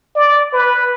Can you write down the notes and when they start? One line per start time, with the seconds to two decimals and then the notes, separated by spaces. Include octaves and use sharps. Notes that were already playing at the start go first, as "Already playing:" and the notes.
0.16 D5
0.53 B4